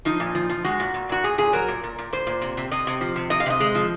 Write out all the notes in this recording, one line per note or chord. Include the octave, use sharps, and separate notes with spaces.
F3 D#4
A#2
F3
F3
G#3 F#4
A#2
A#2
A#2 F#4
A#2 G#4
A#2 G#4
F#3 A#4
A#2
A#2
A#2
A#2 C5
A#2
C3
C3
C3 D#5
C3
F3
C3
C3 D#5
F5
C3 D#5
G#3
F3